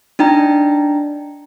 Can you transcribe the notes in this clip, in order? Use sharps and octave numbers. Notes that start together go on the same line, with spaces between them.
D4 D#4 G5 A#5